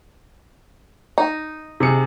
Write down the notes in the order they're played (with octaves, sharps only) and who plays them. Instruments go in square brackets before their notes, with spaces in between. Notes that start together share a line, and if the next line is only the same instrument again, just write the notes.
[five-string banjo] D#4
[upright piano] C3 G#4 C#7